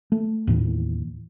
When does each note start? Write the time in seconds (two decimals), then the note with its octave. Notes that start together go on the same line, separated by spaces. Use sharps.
0.12 A3
0.47 D#2 A2 E3